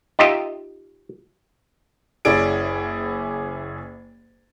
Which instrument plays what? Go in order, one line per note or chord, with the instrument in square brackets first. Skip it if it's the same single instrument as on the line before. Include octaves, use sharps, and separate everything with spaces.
[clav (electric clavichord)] D#4 F4 G4 D#5 E5
[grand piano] F#1 C#4 E4 G#4 D5 D7